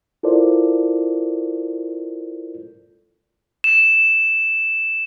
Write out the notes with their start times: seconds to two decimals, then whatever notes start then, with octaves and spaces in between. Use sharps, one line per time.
0.23 E4 F4 A4 A#4 C5 D5
3.64 E7